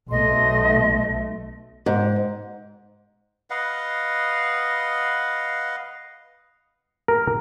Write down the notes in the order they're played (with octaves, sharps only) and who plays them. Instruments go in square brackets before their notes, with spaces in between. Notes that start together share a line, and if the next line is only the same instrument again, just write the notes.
[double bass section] B1 A3 [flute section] D#5 C6
[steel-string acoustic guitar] G#2
[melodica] B4 D#5 F5 F#5
[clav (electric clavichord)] A#4